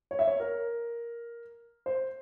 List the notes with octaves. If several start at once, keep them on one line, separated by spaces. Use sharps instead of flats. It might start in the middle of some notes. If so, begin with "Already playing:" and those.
C#5
E5
C#5
A#4
C5